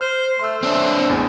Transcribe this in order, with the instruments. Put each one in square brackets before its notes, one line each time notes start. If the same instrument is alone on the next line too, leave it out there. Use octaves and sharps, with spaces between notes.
[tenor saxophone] C5 [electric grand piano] F6
[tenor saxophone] A3 [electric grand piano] C6 E6
[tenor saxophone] E3 [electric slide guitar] C4 D4
[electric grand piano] A1 E2 B3 [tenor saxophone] G#3